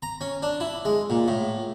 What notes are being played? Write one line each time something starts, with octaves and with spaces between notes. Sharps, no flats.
A#5
C#4
D4
E4
G#3
A#2
A2